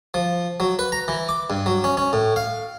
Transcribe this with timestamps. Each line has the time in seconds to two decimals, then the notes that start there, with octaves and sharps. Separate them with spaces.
0.14 F3
0.60 F#3
0.79 B4
0.92 A#5
1.08 E3
1.29 D6
1.50 G2
1.66 F#3
1.84 C#4
1.97 C#4
2.13 A2
2.36 F5